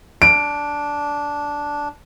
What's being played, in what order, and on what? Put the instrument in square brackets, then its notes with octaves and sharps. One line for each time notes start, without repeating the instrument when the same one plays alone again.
[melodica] D4 [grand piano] D7